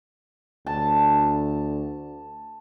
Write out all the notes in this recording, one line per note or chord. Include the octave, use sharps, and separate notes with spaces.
D2 A5